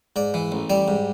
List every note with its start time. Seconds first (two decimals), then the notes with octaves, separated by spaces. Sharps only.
0.16 G#2 D5
0.34 E3
0.52 A1
0.70 G3 D5
0.88 G#2